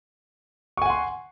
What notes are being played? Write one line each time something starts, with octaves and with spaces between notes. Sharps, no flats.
F#5 G#5 C6 C#6